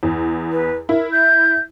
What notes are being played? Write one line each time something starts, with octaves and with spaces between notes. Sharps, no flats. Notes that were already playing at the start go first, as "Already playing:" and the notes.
E2
B4
E4 A#4
G6